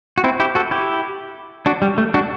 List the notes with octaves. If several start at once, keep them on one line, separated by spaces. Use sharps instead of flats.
F#4
C4 E4
E4 G4
F#4 A4
E4 G4
D4 F#4
G3
A3
D4 F#4